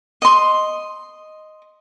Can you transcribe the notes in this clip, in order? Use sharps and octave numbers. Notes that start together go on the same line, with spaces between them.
D#5 C6